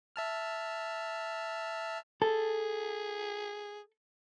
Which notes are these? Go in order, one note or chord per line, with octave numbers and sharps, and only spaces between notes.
E5 A5 F6
G#4 A4